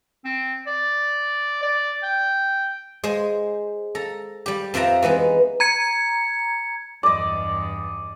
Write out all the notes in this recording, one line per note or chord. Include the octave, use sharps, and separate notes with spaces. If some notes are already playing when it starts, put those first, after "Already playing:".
C4
D5
D5
G5
G#3 G#4 C5
A4 A#5
G3 G4
F2 F3 C4 E5 A#5
E3 G#3 B3 D#4
A#5 G#6 C#7
E2 G2 D5 D#5 D6